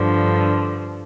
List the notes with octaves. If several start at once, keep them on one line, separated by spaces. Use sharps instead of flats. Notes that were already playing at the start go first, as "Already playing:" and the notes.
Already playing: G2 D3 F3